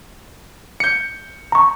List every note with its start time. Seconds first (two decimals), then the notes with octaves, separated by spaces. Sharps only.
0.80 G6 C#7
1.52 A#5 C#6